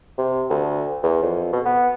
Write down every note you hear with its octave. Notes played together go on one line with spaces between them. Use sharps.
C3
D2
E2
F2
B2
B3